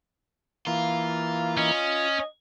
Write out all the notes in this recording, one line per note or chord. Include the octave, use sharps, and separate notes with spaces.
E3 A#3 F4 F5
C#4 D#5